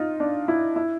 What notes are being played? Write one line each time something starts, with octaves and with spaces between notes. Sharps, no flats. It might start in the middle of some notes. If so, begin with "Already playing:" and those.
Already playing: D#4 F4
D4
E4
E4